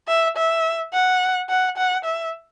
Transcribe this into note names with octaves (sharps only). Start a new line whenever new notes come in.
E5
E5
F#5
F#5
F#5
E5